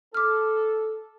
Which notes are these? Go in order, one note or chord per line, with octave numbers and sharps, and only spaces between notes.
A4 D6 F6